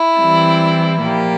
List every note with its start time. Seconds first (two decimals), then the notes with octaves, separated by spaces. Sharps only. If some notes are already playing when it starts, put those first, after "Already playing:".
Already playing: E4
0.17 E3 G3 C4
1.02 A#2 F3 A#3 G4